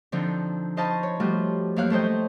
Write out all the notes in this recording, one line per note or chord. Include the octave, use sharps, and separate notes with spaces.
D3 F3 C4 D#4
C5 D#5 F5 A5 B5 C#6
C#5
F3 G3 A3 F4 F#4
F#2 A#3 C#5 F5 F#6
A3 A4 C5 C#5 D#5 G5